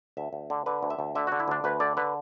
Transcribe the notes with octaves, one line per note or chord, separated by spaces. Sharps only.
D2 E5
D2
D3
D3 B4
D2
E5
D2
D3 E5
D3 F#4
E4
D2 D4
D2 B4
D3 D5
D3 B4